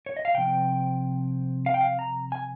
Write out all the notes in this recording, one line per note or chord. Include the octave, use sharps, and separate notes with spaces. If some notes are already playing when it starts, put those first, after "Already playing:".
C#5
D#5
F5
C3 F3 C4 G5
F5
G5
F5
A#5
G#5